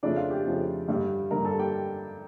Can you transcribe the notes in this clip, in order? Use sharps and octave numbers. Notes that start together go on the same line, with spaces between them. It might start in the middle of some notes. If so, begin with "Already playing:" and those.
F2 C#3 F3 A3 D4 D5
F4 F5
G4 G5
F2 C#3 F3 A3
G2 D3 G3
G2 D3 G3 A#4 A#5
A4 A5
G4 G5